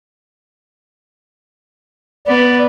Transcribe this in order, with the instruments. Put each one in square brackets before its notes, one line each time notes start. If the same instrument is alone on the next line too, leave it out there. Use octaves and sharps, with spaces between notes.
[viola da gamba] B3 [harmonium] D5